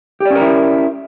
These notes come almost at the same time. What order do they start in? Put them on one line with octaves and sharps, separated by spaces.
G4 D5 C#4 A#4 E4